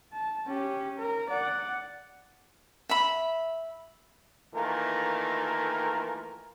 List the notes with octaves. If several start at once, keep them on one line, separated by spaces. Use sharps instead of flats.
A5
C#4 G4
A#4
D5 F#5
E5 B5
D#3 E3 A3 A#3 F4 A#4